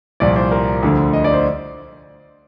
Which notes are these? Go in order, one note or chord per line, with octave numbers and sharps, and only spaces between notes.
C2 A#2 F3 D5
C5
A#4
D2 D3 F3
D#5
D5
C5